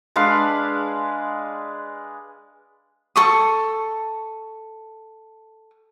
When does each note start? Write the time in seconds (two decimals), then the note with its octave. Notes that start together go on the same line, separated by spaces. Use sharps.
0.16 G#3 D4 B4 F5
3.16 A4 C#6 D#6